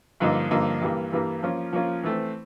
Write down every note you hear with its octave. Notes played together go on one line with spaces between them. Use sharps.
G2 D3 F3 A#3 D#4
G2 D3 F3 A#3 D#4
G2 E3 G3 A#3
G2 E3 G3 A#3
F3 A#3 C#4 F4
F3 A#3 C#4 F4
E3 A3 C4